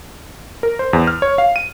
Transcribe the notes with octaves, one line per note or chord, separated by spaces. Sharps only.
A#4
C5
E2
F6
C#5
F5
D#7